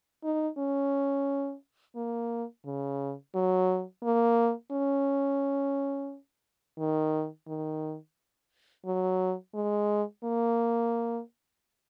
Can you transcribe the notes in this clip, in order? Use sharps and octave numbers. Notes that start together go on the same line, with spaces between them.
D#4
C#4
A#3
C#3
F#3
A#3
C#4
D#3
D#3
F#3
G#3
A#3